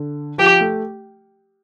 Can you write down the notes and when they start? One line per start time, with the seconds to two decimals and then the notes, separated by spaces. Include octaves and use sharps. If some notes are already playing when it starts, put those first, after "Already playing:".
Already playing: D3
0.38 F3 G4
0.61 A3